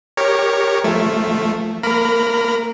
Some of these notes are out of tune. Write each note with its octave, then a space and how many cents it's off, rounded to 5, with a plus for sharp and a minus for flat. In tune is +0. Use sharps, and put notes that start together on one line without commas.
G4 +20 A#4 +0 C#5 +0
F3 +0 A3 +0
A#3 -20 A#4 +0 B5 +20